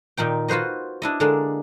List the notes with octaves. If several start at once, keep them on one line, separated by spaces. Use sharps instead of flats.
A#2 D#3 D#4 G5
F4 F#4 B4 C5 D#5
D4 E4 D#5
D3 G#3 A#3 D4